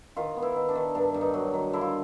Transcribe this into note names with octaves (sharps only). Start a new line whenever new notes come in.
D#3 F4
B3
E4
D#3
D4
D#3
G2 D4
G2
D#4
F#3
D#3
D3 E4
F4